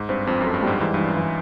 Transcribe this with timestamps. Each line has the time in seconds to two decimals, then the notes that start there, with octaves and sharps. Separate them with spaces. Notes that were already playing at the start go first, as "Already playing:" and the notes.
Already playing: G#2
0.09 G2 C4
0.27 F2 C4
0.41 F#2 A4
0.54 G2
0.62 G#2 G3
0.80 G#2 E3
0.94 G2 E3
1.07 F#2
1.17 E3